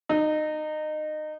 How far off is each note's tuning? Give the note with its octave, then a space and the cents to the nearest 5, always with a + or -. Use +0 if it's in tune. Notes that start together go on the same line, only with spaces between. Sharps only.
D#4 -25